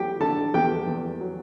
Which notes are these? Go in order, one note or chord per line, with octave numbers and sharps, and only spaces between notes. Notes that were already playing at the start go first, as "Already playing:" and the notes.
Already playing: E2 F#3 G4 G5
D3 A4 A5
E2 G4 G5
E2
F#3